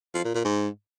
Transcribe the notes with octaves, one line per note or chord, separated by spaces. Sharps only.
F3
A#2
A#2
G#2